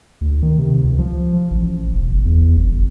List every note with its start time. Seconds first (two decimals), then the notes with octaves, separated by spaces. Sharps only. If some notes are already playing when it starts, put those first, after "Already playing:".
0.21 D2
0.43 D#3
0.58 C3
0.84 C#2
0.98 F3
1.51 A1
1.92 E1
2.11 G1
2.26 E2
2.57 G1
2.72 G1